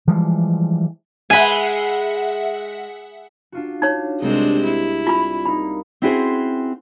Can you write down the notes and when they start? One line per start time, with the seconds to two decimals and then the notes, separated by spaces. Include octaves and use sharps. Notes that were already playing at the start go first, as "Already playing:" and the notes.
0.07 E3 F3 G3 G#3
1.30 G#3 E5 F#5 G#5 B5
3.52 D4 F4 F#4
3.82 D4 D#4 C#5
4.21 C2 G3 G#3 C4 D4 G6
4.64 E4
5.07 F4 B5
5.45 A#3 D#4 B5
6.02 C4 C#4 E4 F#4 G#4 C5